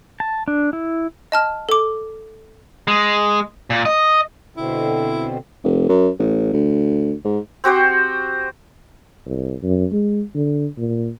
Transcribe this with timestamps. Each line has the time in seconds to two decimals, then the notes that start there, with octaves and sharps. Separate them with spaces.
0.20 A5
0.48 D4
0.73 E4
1.32 D#5 A5 F6
1.69 A4 D6
2.88 G#3
3.70 A#2
3.85 D#5
4.57 B2 D3 C4 E4
5.64 F1
5.89 F#2
6.19 A1
6.53 D2
7.25 G#2
7.64 C4 F#4 G4 C5
9.26 C2
9.63 F#2
9.92 G#3
10.35 D3
10.78 A#2